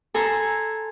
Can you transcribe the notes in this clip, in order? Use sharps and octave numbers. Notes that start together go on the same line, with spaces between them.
A4 G#5 A#5 C6 E6